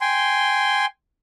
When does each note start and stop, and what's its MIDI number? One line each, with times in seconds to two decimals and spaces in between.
0.01 0.86 79
0.01 0.86 80
0.01 0.86 84